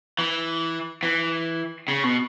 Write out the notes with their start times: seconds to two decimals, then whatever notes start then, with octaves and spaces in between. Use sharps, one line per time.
0.19 E3
1.03 E3
1.88 C#3
2.04 B2